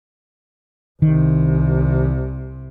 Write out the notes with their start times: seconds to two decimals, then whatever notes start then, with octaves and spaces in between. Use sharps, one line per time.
1.02 C2 C3 D#3